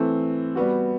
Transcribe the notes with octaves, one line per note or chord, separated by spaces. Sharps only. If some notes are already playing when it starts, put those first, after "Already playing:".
Already playing: E3 A3 C4
G3 B3 F#4